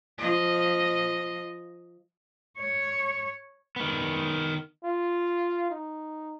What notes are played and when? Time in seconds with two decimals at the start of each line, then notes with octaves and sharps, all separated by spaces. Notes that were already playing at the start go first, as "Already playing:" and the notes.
0.18 F3 D#5
2.58 C#5
3.76 D#3 B3
4.84 F4
5.70 D#4